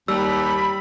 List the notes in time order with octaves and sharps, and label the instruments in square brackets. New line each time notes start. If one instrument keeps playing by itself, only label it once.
[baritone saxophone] D#2 [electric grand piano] G3 [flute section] B5 [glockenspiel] E6